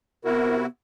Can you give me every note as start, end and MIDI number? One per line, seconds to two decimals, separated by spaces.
0.25 0.66 48
0.25 0.67 59
0.25 0.66 64
0.25 0.66 66
0.25 0.60 70